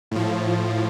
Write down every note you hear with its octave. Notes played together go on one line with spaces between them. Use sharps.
A2 F3